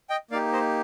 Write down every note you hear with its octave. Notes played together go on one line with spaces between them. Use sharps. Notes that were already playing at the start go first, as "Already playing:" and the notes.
D#5 G5
A#3 D#4 G4 D5 F5
C5 D#5